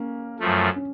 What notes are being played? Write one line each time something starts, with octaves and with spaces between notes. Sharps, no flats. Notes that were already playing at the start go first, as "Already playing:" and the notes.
Already playing: A#3 C#4
F#2 F3 A3
C#4